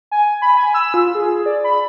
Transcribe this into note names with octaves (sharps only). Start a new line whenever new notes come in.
G#5
B5
G#5
E6
F4
G#4
D5
B5